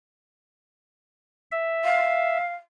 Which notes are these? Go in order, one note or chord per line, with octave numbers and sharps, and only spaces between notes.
E5
F5